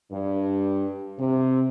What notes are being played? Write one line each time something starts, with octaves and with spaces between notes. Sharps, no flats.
G2
C3